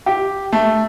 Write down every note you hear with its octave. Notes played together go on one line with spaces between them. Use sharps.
G4
A3